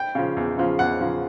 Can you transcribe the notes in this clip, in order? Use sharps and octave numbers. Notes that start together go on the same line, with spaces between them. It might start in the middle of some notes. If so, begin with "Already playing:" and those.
Already playing: G5
C#3 F3
E2
C#3 F3
E2 F#5
C#3 F3